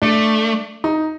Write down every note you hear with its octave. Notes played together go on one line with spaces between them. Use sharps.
A3 D4
D#4